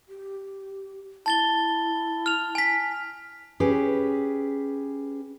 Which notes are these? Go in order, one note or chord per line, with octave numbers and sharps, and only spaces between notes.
G4
E4 A5 A6 G7
F6 F7
G#5 B6
C#4 G4 G#4 B4